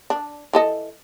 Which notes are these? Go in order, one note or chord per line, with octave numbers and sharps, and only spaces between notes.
D4
E3 A4 D#5